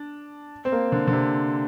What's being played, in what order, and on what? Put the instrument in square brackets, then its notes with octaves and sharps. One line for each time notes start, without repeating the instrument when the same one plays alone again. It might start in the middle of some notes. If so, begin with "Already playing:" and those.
Already playing: [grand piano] D4
C4
A#3
D3
D3
C3